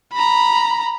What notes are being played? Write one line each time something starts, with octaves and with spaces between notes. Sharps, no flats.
A#5 B5